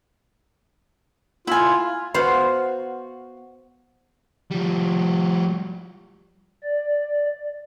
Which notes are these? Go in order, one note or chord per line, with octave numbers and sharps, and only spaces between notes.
E4 F4 G#5
B3 F#4 C5 F5
F3 G3
D5